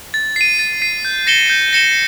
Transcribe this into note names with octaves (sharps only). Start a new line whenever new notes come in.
A6
C7 D#7
A6
C7 D#7
G6
A#6 C#7 E7 G7
G6
A#6 C#7 E7 G7